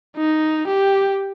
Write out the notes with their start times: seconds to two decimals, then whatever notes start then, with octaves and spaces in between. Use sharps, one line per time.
0.17 D#4
0.68 G4